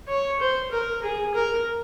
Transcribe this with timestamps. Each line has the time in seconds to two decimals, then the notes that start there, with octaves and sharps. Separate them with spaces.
0.08 C#5
0.40 C5
0.72 A#4
1.03 G#4
1.35 A#4